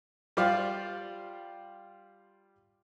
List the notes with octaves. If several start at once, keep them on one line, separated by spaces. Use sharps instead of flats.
G3 F4 G4 C5 D5 F5